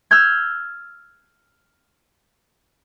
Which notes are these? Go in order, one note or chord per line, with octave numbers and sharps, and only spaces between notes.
E6 F6 G6 G#6